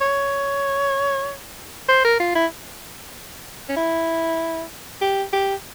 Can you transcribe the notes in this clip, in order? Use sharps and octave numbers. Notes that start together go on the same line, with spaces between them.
C#5
C5
A#4
F4
E4
C#4
E4
G4
G4